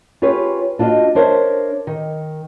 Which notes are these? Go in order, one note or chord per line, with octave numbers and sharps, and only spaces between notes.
F4 G4 G#4 B4 C#5
D4 F4 F#4 D5 D#5
D4 A#4 C5 C#5 E5
D#3